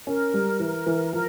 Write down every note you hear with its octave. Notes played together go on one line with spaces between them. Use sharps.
C#4 A#4
G3
E3
E3
F3 A#4